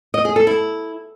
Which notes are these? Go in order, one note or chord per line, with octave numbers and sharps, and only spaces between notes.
D#5
G#4
A4
E4